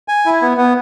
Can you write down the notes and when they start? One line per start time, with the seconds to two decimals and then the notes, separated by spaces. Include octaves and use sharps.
0.08 G#5
0.26 E4
0.42 B3
0.57 B3